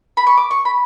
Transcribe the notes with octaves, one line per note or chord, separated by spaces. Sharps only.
B5
C#6
D6
C#6
B5